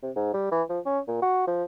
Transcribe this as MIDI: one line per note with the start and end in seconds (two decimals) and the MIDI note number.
0.02 0.11 48
0.16 0.33 44
0.33 0.51 55
0.52 0.63 52
0.69 0.80 53
0.86 0.99 61
1.08 1.20 46
1.22 1.44 66
1.47 1.64 53